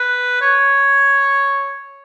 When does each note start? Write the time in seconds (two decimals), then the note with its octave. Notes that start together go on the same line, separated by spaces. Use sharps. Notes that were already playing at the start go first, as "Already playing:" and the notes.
Already playing: B4
0.41 C#5